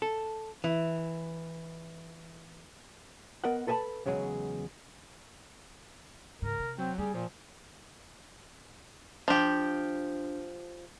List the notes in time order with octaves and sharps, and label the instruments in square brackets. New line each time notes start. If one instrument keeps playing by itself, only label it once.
[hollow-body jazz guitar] A4
E3
B3 A#4 D#5 F#5
A4 B4 D#5 G#5 A5 B5
E2 C#3 F#3 G#3 G#4
[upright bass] C#2 G#2 [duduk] A#4
[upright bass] C3
[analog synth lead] F#3 [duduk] C4
[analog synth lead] G3 [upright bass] A#3 C#4 [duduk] G#4
[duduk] A#2 [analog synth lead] F3
[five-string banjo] F3 G4 [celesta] D4